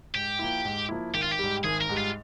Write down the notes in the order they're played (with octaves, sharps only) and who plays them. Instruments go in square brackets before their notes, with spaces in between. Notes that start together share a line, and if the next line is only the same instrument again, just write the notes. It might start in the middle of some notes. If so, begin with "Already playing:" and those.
[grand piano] G#2 [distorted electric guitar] G4
[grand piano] F3 A#3 E4
G#2
F3 A#3 E4
[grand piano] G#1 [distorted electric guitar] G4
[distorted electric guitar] F4
G4
[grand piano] G#2 G3
[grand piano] G#1 [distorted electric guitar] G#4
[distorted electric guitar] A#4
[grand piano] G#2 G3
[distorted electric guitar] F4